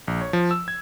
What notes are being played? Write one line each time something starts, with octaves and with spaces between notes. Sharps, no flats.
A#1
C#5
F3
E6
G#6